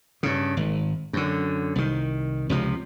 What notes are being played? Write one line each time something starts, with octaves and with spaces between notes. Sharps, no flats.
G2 C#3
G#1
F#2 D3
C2 D#3
C#2 C3 F3